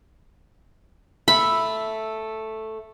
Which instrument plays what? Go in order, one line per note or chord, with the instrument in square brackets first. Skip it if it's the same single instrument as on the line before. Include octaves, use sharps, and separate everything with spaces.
[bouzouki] A3 E5 [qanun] B5